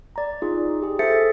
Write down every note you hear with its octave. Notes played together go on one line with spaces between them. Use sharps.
D5 A#5
D#4 F4 G#4
G4 G#4
G#4 A4 C5 E5 A6 C#7